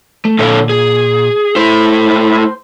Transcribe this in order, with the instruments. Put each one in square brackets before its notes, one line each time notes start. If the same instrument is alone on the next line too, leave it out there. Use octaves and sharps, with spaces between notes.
[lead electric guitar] A3
[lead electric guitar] A#2 [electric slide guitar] D3 A4 C#5
[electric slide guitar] G#4
[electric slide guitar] A3 E4 [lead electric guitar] C5